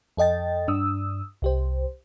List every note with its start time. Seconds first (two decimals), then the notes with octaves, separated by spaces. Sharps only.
0.17 F2 A4 D#5 G5 A6
0.68 G2 D4 D#6 E6
1.42 C2 G4 C5